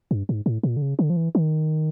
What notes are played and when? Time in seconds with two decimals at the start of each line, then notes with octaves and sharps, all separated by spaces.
0.11 G2
0.29 G#2
0.46 A2
0.63 A#2
0.77 D3
0.82 C#3
0.99 D3
1.10 F3
1.17 E3
1.35 D#3